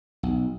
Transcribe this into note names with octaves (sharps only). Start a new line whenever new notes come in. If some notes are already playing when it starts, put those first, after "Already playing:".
B1